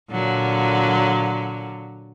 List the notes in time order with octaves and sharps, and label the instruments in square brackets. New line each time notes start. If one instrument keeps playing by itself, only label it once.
[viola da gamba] A#2 D3 F#3